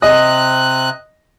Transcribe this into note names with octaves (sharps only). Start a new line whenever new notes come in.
C3 D#5 F#6